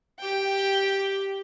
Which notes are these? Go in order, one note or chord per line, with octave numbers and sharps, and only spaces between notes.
G4 G5